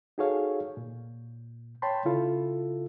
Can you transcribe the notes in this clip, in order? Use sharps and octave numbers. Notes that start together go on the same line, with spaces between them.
D#4 F#4 G#4 A4 C#5 F5
A#2
C#5 G5 A5 B5 C6
C#3 E4 F4 A4